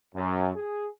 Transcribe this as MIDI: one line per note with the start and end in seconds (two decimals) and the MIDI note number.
0.15 0.50 42
0.56 0.87 68